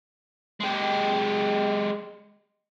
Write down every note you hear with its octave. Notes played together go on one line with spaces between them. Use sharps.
G#3 G4